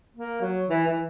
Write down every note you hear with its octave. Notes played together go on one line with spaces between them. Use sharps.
A#3
F#3
E3
E3